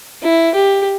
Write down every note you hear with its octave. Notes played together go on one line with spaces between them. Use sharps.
E4
G4